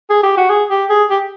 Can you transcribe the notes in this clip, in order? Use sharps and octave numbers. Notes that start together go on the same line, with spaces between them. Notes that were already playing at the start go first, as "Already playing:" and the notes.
G#4
G4
F#4
G#4
G4
G#4
G4